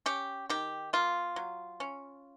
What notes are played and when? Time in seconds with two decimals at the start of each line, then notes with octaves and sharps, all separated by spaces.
0.06 C#4 G4
0.49 D#3 G4
0.93 A#3 F4
1.36 F#3
1.80 C#4